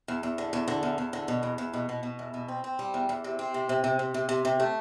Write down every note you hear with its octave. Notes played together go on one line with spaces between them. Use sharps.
E2
E2
D3
E2
D3
E2
E2
D3
B2
E2
E2
B2
B2
B2
E2
B2
C4
C4
G3
E2
E2
C3
C4
C3
C3
C3
C3
C3
C3
C3
A3